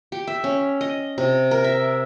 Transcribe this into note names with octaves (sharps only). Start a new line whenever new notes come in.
G4
E5
C#4
D#5
C3
A#4
E5